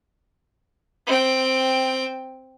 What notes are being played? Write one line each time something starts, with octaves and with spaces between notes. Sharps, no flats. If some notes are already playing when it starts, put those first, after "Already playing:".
C4 G5